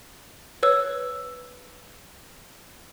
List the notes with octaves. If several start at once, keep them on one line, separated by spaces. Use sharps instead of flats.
B4 C#5 E6